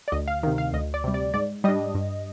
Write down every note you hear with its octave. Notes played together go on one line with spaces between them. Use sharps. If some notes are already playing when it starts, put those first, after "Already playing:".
D5
D2 D#5
F5
C3 D#3
F5
D2 D#5
D5
C3 G3
D5
G#2 D5
G3 D4 D#5
G2